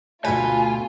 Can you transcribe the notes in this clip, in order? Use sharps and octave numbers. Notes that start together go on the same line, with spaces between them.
D2 B2 A3 F4 B4 G#5